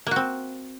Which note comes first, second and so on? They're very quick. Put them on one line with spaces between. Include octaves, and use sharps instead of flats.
A#3 F#4 C4